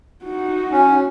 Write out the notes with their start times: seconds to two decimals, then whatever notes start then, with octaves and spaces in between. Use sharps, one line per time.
0.24 D#4 F#4
0.72 C#4